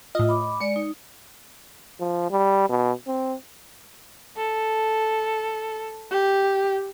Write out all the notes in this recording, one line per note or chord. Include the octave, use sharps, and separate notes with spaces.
A2 F4 D#5
B5 D6
G#3 D5 C#7
D#4
F3
G3
B2
C4
A4
G4